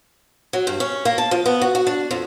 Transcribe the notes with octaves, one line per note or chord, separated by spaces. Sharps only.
F#3
G2
C#4
A#3
A5
F3
B3
F#4
F#4
D4
F2